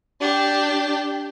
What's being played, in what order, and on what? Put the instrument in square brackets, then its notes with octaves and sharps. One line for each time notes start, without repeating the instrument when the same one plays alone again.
[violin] D4 G4